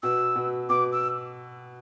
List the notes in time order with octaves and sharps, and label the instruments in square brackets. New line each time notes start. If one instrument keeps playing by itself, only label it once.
[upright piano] B2 B3 [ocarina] E6
[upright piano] B2 B3
[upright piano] B2 B3 [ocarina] D6
[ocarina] E6